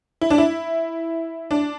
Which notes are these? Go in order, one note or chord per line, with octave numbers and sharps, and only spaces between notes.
E4
D4
E4
D4